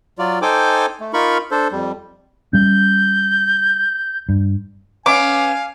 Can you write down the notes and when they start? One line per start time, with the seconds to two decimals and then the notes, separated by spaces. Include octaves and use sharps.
0.19 F#3 F4 D5
0.42 D#4 A4 C5 G5 G#5 D6
1.00 A3
1.13 D#4 F4 A#4 B5 C#6
1.51 D4 A4 C5
1.72 F2 G3
2.53 G3 C#4 G6
4.29 G2
5.06 B3 C#4 F5 G#5 D6